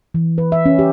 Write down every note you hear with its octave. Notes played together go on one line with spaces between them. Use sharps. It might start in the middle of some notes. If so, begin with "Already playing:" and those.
E3
B4
E5
C#4
G4